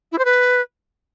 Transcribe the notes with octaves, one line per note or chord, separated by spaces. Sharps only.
E4
C5
B4